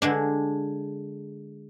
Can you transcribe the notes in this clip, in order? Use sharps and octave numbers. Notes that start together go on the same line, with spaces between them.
D3 G#3 D4